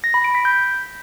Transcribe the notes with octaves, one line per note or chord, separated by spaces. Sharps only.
A#6
B5
D7
B6
G6